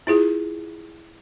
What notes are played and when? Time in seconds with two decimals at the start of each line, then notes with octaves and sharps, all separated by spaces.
0.07 E4 F4 G#4